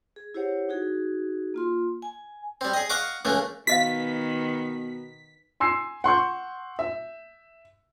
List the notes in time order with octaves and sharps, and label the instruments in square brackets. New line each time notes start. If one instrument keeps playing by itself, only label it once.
[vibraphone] G#4
E4 G4 C5 C#5 F#5
D#4 F#4 G#4
A#3 F4 C6
G#5
[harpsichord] G3 C4
G#4 D#5
D#5 F5 F#5 C#6 D6
C#2 E3 A3 A#3
[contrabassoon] B2 [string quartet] D#3 B3 [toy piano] F#4 D#5 F5 [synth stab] B6
[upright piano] G#5 C6 E6 C7
F#5 C6 C#6 G6
E5